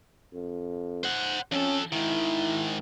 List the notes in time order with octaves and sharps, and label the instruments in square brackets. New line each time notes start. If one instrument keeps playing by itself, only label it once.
[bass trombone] F2
[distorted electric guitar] C5 F#5
[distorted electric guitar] F2 A4 [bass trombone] C#4
[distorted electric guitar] G#2 D#3 [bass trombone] E4